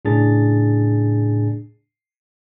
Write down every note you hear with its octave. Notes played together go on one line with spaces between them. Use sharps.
A2 C#3 D4 G#4 A6